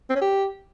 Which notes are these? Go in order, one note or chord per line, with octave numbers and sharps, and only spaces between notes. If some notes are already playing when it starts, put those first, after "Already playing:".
C4
C#4
G4